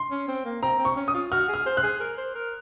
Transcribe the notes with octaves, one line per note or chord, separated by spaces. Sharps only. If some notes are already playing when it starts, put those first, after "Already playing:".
Already playing: C6
C#4
C4
A#3
C4 A#5
C4
C#6
C#4
D#6
F4
F#4 F6
G#4
F6
C5
F#6
G#4
A#4
C5
A#4